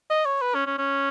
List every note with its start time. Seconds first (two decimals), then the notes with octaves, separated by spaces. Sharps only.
0.10 D#5
0.25 C#5
0.41 B4
0.55 C#4
0.66 C#4
0.78 C#4